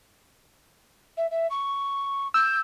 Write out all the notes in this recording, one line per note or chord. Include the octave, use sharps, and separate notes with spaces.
E5
E5
C#6
E6 G6